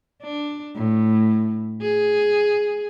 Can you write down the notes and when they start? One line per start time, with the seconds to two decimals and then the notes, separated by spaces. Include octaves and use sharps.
0.22 D4
0.75 A2
1.81 G#4